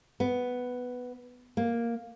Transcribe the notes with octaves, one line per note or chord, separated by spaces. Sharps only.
B3
A#3